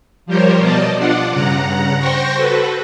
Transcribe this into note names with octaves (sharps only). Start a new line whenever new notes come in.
F3 G3 G4 A#4 C5 C#5
B2 D5 D#5 A5
D4 F4 D5 F#5
G2 C#3 F#5 A#5
C5 G5 C6 C#6 A#6
F#4 A4 B4